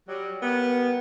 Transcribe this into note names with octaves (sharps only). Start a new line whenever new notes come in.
F#3 G3
G3 A#3 B3